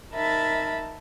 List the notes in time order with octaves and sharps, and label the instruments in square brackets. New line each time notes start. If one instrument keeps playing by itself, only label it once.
[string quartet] D#4 A#4 E5 A5 B5 A6